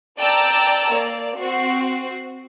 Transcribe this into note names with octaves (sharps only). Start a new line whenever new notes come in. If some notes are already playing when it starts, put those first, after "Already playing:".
D5 G5 A5 A#5 E6
A#3 D5
C4 F#4 C7